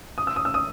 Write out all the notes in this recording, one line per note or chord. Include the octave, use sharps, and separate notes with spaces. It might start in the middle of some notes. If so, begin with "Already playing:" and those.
D#6
E6
D#6
E6
D#6